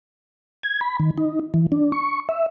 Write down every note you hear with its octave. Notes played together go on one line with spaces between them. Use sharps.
G#6
B5
D#3
D#4
E3
D4
C#6
E5